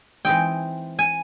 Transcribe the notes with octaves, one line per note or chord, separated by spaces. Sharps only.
E3 G#3 C4 D#4 G5
G#5